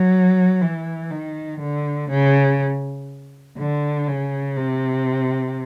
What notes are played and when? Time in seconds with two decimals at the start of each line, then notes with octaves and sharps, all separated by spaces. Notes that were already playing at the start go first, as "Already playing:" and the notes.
Already playing: F#3
0.61 E3
1.10 D#3
1.60 D3
2.10 C#3
3.57 D3
4.08 C#3
4.57 C3